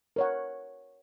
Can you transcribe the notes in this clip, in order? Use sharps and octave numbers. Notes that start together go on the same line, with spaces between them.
A#4 C#5 F#5